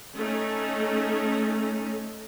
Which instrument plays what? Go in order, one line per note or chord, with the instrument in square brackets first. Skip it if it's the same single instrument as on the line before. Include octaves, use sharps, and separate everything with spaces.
[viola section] A3 C#4 D#4